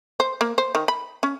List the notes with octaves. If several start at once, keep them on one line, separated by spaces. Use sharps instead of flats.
C5
A#3
C5
D#3
B5
C#4